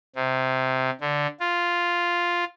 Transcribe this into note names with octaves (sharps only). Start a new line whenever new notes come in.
C3
D3
F4